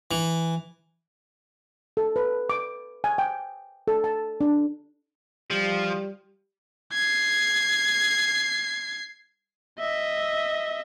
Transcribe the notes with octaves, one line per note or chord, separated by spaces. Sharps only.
E3
A4
B4
D6
G#5
G5
A4
A5
D4
F3 G3
G#6 C7
D#5 E5